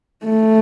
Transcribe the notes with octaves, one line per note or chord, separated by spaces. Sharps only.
A3